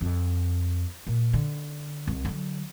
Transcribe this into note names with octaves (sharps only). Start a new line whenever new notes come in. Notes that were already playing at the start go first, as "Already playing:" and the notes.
F2
A#2
D3
C2
D3 F#3